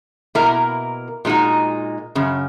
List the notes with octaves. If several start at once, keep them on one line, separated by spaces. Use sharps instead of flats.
B2 A#3 E4 A#4
A#2 G#3 D#4 F#4
F#2 C#3